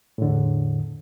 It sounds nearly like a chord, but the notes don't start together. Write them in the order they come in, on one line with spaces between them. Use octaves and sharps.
A2 D3 E2